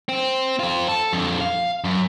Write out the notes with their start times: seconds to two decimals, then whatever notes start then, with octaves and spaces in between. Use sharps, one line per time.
0.09 C4
0.59 C4 F4
0.89 A4
1.13 F2 D3
1.41 F5
1.84 F#2